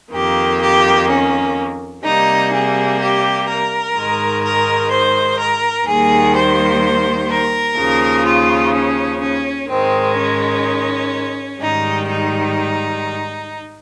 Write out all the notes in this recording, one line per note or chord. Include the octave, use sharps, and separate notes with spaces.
F2 D#3 A#3 G4
G4
C#4
C3 G3 A#3 D#4
G#4
G4
A#4
G#2 D#3 G#3
A#4
C5
A#4
D#2 D#3 G3 A#3 G#4
C5
A#4
D#2 C#3 F3
F4
C#4
C#4
G#2 D#3 G#3 C4
C#4
G#2 D#3 G3 D#4
D#4